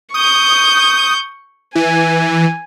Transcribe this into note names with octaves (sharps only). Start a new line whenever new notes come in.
C#6 D#6 G6
E3 G#5